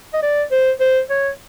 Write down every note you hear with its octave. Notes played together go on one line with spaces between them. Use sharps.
D#5
D5
C5
C5
C#5